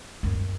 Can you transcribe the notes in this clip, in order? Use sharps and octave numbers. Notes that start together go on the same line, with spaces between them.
F#2